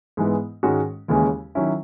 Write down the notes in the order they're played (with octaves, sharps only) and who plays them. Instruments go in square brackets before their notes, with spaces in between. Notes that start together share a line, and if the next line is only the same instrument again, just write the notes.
[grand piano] G#2 E3 G#3 B3
G#2 D#3 G#3 C#4 F#4
D#2 C#3 E3 G#3 C#4
D#3 F#3 C#4 E4